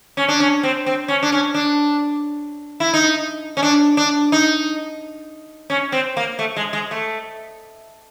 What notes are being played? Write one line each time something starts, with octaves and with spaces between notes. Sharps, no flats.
C#4
D4
C#4
C4
C4
C#4
D4
C#4
D4
E4
D#4
C#4
D4
D4
D#4
C#4
C4
A#3
A3
G#3
G#3
A3